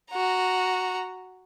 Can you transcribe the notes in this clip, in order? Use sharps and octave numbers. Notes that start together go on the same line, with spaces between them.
F#4 A#5